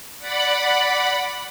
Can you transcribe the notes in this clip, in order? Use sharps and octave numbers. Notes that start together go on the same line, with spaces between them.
D5 F#5 B5